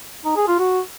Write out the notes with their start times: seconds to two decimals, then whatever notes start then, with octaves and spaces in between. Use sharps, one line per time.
0.25 D#4
0.36 G#4
0.48 F4
0.59 F#4